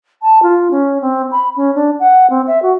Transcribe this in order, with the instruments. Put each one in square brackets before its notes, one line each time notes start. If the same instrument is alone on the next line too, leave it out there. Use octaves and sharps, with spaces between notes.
[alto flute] A5
F4
C#4
C4
B5
C#4
D4
F#5
C4
E5
F#4